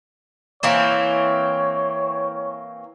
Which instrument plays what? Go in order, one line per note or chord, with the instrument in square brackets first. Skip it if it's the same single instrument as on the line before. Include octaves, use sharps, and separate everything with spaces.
[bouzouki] E3 A#3 C4 [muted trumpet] C#5